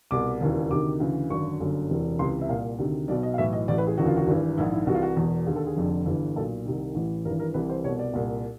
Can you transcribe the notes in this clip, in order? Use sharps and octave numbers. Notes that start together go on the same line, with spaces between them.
C2 B2 D6
E1 D#2 C#3 E3
D2 C3 D#3 D6
D2 C#3 E3
G#1 F#2 D3 C#6
G1 F#2 D3
E1 E2 C3 E3
C#2 C3 E3 C6
E5
C2 A#2 F5
D2 C3 D#3
B1 B2 D5
D#5
F5
B1 A2 E3 E5
D#5
A1 A2 E3 D5
B4
G#4
E1 D2 C#3 E3 F#4
F4
F#4
G#1 G2 E3
A#1 G#2 D#3 E4
E4
C2 C3 E3 F#4
F4
F#4
E1 E2 B2
D#2 D3 G#4
A4
G#4
F1 F2 D3
G1 G2 E3
B1 A#2 A4
C2 C3 D#3
A1 A2 E3
G#1 G2 E3 A#4
A#4
C2 C3 E3 B4
C5
C2 B2 C#5
D5
C2 A#2